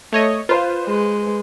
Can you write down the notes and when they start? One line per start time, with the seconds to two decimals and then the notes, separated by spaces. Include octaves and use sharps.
0.12 A3 C#5 D#5
0.49 F4 B4 C5
0.86 G#3